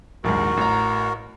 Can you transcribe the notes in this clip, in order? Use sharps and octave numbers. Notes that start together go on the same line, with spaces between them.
A#1 D#2 G#2 F#4 A#4
A1 A#5